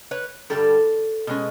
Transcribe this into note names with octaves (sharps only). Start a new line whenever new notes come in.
B4 C#5
G2 D3 G3 A4
B2 G#3 C#4